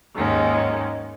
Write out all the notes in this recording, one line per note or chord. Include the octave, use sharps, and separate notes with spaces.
D#2 G#2 D#3 G#3 C#4